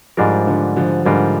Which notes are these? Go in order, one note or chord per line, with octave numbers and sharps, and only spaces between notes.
G#2 F3 G3 G#3 D4 F4 A#4
D3 F3
D3 F3
G#2 D3 F3 G3 D4 F4 A#4